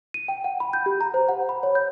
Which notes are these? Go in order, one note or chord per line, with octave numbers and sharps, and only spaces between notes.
D#7
G5
F#5
B5
G6
G4
A#5
C5
F#5
B5
C#5
G6